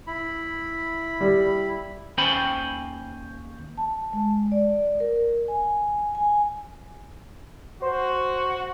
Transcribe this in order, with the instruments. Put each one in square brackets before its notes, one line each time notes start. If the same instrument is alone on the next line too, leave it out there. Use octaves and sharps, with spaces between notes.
[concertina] E4 B5
[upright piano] G3
[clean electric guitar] D#2 C#4 C5 G5 G#5 B5
[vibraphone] A5
G#3
D5
A#4
G#5
G#5
[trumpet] F#4 [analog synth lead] C5